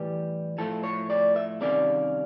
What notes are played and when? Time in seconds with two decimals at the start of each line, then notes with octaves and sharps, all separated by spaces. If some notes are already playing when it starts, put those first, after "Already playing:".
Already playing: A2 E3 G3 G4
0.58 A2 F3 A3 A4
0.84 C#5
1.10 D5
1.36 E5
1.61 C3 D#3 G3 A#3 C#4 D5